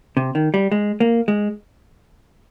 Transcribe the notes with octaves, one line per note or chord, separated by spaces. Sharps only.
C3
D#3
G3
G#3
A#3
G#3